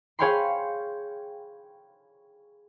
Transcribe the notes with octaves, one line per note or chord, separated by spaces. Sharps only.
G#4 C#5 F5 G5 B5 C6